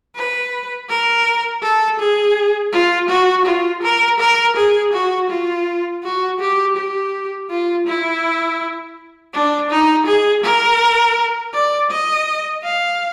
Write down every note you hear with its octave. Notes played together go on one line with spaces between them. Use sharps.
B4
A#4
A4
G#4
F4
F#4
F4
A#4
A#4
G#4
F#4
F4
F#4
G4
G4
F4
E4
D4
D#4
G#4
A#4
D5
D#5
F5